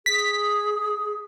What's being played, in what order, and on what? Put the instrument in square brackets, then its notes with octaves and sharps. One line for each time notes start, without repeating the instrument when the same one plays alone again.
[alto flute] G#4 [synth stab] B6